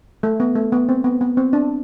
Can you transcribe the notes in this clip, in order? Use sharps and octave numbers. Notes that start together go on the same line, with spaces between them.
A3
B3
A3
B3
C4
B3
B3
C4
D4